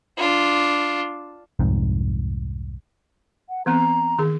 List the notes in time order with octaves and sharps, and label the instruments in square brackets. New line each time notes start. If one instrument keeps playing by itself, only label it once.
[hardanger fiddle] D4 F4
[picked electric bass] C2 F2 G#2
[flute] F#5
[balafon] E3 B3 C4 [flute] A#5
[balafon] D#3 G#4